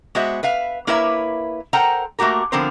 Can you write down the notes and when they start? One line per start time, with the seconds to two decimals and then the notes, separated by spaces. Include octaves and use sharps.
0.15 G#3 B3 F#4 C5 E5
0.43 B4 E5 F5
0.87 A#3 E4 A#4 B4 C#5 E5
1.73 A4 A#4 C5 F#5 G5 A#5
2.19 A3 A#3 F#4 G4 A#4
2.52 D3 F3 B3 C4 A#4 C5